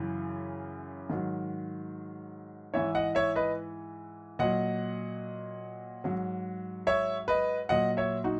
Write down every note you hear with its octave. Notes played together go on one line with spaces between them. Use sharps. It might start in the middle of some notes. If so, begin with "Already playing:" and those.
Already playing: F#2 C#3 E3
G#2 D#3 F#3
G#2 E3 C#5 E5
D#5 F#5
C#5 E5
B4 D#5
A#2 F#3 D#5 F#5
G#2 F#3
C#5 E5
B4 D#5
A#2 F#3 D#5 F#5
C#5 E5
D#4 F#4